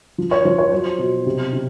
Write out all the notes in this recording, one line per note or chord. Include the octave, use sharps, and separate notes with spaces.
F3
C#5
F3 C5
C#5
F#3 C5
B2
C3
C3